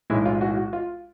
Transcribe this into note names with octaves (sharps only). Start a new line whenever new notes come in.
B1 A2 E3 G#3 E4
F4
F#4
F#4
F4